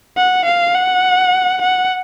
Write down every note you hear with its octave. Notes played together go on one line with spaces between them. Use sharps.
F#5
F5
F#5
F#5